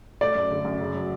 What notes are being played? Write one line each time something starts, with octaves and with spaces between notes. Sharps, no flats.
A3 D5
F#2
D3
F#2
C#3
F#3